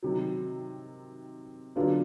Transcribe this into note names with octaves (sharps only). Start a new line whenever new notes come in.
C3 D#3 F#3
D3 F#3 B3 D4 F4